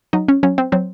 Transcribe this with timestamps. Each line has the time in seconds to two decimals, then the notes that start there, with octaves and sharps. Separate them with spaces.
0.13 F#3 D#4
0.28 C#4
0.43 F#3 C#4
0.58 C4
0.72 F#3 C4